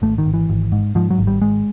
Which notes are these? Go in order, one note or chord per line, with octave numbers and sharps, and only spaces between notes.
G#1 A3
D#3
G#1
E3
G#1
G#2
G#2 F3
F#3
G#1
G3
G#1 G#3